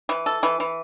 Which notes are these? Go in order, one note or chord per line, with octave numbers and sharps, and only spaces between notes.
E3
A4
E3
E3